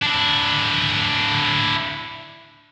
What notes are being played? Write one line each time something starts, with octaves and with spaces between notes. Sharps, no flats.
D4 E4